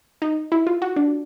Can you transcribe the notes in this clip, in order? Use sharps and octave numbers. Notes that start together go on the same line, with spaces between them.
D#4
E4
F4
F#4
D4